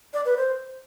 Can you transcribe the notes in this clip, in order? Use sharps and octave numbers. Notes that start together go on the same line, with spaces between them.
D5
B4
C5